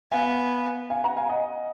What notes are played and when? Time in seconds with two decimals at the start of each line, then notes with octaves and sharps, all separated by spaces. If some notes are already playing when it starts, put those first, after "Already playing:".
0.12 B3 F5 G#5
0.90 F5 G#5
1.04 F#5 A#5
1.16 F5 G#5
1.29 D#5 F#5